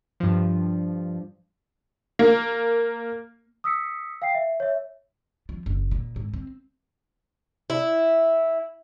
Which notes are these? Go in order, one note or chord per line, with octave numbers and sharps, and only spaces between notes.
G2 F3
A#3
D#6 E6 B6 C#7
F5 G5 C7
E5
C#5 E5
F3
F#1
A#2
G#2
C4
E4